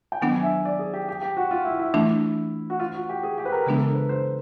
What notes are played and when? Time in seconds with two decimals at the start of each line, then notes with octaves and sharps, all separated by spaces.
0.12 G5
0.22 D#3 F#3 B3 D4 F#5
0.32 G#5
0.43 E5
0.65 D5
0.79 G#4
0.94 G4
1.08 G4
1.22 G4
1.37 F#4
1.51 F4
1.65 E4
1.79 E4
1.94 E3 A3 D4
2.70 F#4
2.80 F4
2.94 F#4
3.09 G4
3.23 G#4
3.38 G4
3.45 B4
3.52 A#4
3.66 C#3 E3 G#3 B3 D4
3.75 A4
3.80 A#4
3.95 B4
4.09 C5